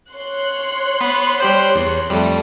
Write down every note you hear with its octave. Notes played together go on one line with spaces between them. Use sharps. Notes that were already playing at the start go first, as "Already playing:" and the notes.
C#5 C6 F#6
B3 B4
G3 G4 C5
E2
F2 G3 A3